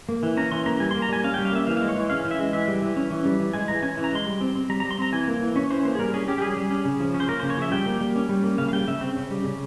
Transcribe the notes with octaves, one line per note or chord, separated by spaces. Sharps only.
A#3
E3
C#4 A#5
E3 C6
A#3 A#5
G3 G#5
C6
A#3
A#5
G3 G#5
C#4 F5
G5
G3
F5
A#3 E5
E3 F5
F5
G#3
C#5
E3
C#4 F5
E3
E5
G#3
E3 E5
G3
E3
C#4
E3
G3
E3
G#3 G#5
E3 A#5
C#4 G#5
E3
A#5
G#3 C6
G3
C4
C4
G3 A#5
A#5
G3
C6
C4 A#5
E3 G#5
A#3
E3
C#4 C#5
E3 C5
A#3 C5
G#4
G3 A#4
C#4 G#4
C#4 G4
G4
G3 G#4
G3
C#4
C#3
F3
C#4
C5
A#3 A#4
C5
C#3
C#5
F3 E5
G3 G5
A#3
G3
C#4
G3
A#3
C#3 F5
F5
G3 G5
C#3 E5
C4
C#3
G3
C#3